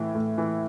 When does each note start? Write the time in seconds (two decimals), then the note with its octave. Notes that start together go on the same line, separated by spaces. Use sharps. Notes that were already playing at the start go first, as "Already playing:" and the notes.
Already playing: A2 E3
0.15 A2
0.38 E3